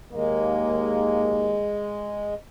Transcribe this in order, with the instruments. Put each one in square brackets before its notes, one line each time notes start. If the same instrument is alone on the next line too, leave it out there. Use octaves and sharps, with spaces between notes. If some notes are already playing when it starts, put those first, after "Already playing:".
[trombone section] D#2 A#3 [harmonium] G#3